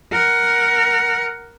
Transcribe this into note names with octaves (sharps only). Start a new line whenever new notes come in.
A#4 F#5